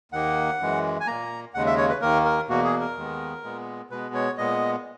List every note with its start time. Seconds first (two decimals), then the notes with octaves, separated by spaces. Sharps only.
0.12 D#2 D#3 A#3 F#5
0.59 F#2 E3 G#3
1.00 G#5
1.07 A#2 A#3 A#5
1.54 D#2 C#3 G#3 F#5
1.66 E5
1.77 C#5
1.89 B4
2.01 D#2 D#3 A#3 A#4
2.25 A#4
2.48 E2 B2 A#3 F#4
2.64 G#4
2.80 A#4
2.96 D#2 D#3 G#3 B3
3.43 A#2 G#3 B3
3.90 B2 G#3 B3 B4
4.14 C#5
4.38 A#2 G#3 B3 D#5